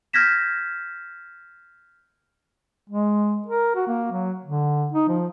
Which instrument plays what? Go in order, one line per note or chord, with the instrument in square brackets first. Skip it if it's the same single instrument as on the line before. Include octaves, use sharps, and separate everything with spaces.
[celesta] F6 G6 G#6 A#6 B6 E7
[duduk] G#3
A#4
F#4
A#3
F#3
D3
D#4
F3